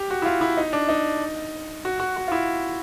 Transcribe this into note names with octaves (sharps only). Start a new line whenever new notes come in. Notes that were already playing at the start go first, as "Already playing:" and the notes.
Already playing: G4
F#4
E4
F4
E4
D#4
D4
D#4
F#4
F#4
F#4
F4
E4